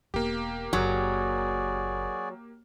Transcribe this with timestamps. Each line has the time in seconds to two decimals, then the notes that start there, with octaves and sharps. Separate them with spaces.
0.14 E1 A#3 G4
0.73 F#1 F#3 F#4 G#4 D5